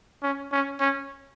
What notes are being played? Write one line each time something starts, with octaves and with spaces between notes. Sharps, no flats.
C#4
C#4
C#4